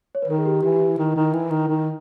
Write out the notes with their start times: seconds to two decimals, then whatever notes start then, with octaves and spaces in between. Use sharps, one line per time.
0.15 C#5
0.22 B4
0.28 D#3 A#4
0.38 G#4
0.46 G4
0.63 E3 G4
0.76 G4
0.80 E4
0.98 D#3
1.16 D#3
1.33 E3
1.50 D#3
1.68 D#3